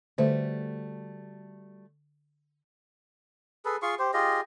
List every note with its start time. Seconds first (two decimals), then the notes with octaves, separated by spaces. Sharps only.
0.18 D3 G3 A3 F#4 C5 E5
3.65 G#4 A4 B4
3.82 F4 G#4 C6 C#6
3.99 G4 C5
4.14 F4 G4 G#4 D#5